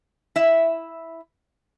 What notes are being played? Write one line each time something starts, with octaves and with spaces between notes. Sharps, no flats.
E4 E5